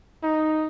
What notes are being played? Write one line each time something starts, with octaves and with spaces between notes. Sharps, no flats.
D#4